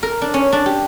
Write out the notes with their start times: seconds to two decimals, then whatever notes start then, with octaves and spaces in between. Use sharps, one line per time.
0.03 A#4
0.22 D4
0.34 C#4
0.53 D4
0.66 G4